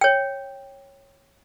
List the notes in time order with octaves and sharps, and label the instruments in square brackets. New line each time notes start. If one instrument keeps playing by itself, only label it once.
[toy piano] C#5 G5